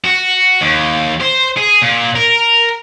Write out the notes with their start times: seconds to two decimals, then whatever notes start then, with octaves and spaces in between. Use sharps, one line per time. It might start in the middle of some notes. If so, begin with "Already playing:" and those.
0.04 F#4
0.61 D#2
1.21 C5
1.57 G#4
1.82 A#2
2.16 A#4